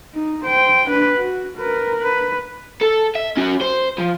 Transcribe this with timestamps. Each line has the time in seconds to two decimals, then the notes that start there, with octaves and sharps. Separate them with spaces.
0.15 D#4
0.45 C5 G5
0.88 D4 B4
1.18 F#4
1.58 A#4 B4
2.00 B4
2.82 A4
3.16 E5
3.37 C#4 F#4
3.62 C5
3.99 F3